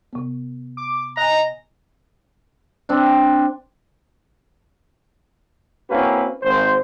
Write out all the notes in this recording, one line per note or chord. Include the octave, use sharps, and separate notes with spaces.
C3 B3
D6
D#5 G#5 A#5 F#6
C4 D4
A#3 C4 C#4 E4 F#4 B4
G#1 C5